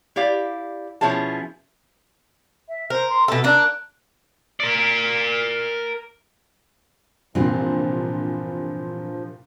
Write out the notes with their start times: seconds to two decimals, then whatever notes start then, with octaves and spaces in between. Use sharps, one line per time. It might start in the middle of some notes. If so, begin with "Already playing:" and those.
0.16 E4 G4 D5 F5
1.01 B2 F3 C#4 E4 G#4 A5
2.68 E5
2.90 A#4 C5
3.09 C6
3.28 B2 A4 E5
3.44 A#3 D4 F#6
4.60 A#4 D5
7.35 C2 G2 A#2 E3 F3 C4